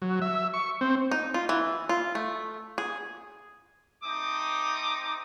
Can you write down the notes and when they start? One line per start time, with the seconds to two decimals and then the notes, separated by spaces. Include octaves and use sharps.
0.02 F#3
0.22 E5
0.54 C#6
0.81 C4
1.11 D#4
1.34 F4
1.49 E3
1.89 F4
2.15 A3
2.78 G#4
4.04 A3 C4 D#4 D6 D#6